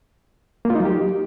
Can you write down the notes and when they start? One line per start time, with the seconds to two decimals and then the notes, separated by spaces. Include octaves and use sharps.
0.65 A#3
0.70 F4
0.75 D#4
0.80 F#3
0.85 G4